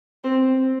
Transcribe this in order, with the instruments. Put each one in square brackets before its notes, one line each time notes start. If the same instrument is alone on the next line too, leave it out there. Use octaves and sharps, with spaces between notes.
[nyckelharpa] C4